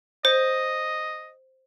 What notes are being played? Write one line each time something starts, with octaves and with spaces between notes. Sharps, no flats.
C5 D#5